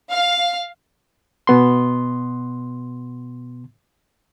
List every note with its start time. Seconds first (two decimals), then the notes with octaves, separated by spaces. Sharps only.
0.10 F5
1.47 B2 B3 C6